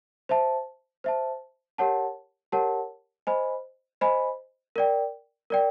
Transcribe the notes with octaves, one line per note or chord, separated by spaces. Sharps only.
C5 E5 A5
C5 E5 A5
G4 A#4 C#5 F#5 A5
G4 A#4 C#5 F#5 A5
C5 D#5 G#5 B5
C5 D#5 G#5 B5
A#4 D5 G5
A#4 D5 G5